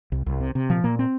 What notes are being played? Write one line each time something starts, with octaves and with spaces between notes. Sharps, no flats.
C2
C2
C3
C3
A#2 F3
A#2 A#3
C4